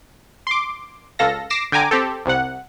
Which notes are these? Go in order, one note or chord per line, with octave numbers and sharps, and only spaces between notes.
C6 D6
C#2 A4 F5 A#6
D6 A#6 C7 E7
D3 G5 G#5 A#5 D6
C4 G4 A4
C2 C3 F#5